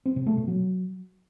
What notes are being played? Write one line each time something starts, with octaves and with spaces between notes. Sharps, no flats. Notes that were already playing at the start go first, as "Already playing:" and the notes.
C4
C3
A3
B2
F#3